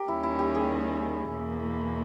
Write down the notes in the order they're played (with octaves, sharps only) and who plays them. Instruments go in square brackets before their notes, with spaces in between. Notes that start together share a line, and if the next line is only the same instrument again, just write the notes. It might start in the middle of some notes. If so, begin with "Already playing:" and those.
Already playing: [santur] G4 A#4
[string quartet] D#2 D#3 G3 C#4 [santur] E4
[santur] E4
G4
G#4
[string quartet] E2 B2 A#3